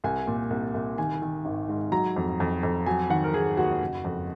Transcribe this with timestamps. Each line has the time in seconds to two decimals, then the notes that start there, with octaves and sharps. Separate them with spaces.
0.04 C2 G#5
0.27 A#2
0.50 C2
0.74 C2
0.98 D#3 G#5
1.22 D#3
1.45 G#1
1.68 G#2
1.92 F#3 A#5
2.16 F2
2.40 F2
2.63 F2
2.86 F#3 G#5
3.10 D#3 F#5
3.24 A#4
3.34 D#3 G#4
3.57 D#2 F#4
3.81 F#1
4.05 F2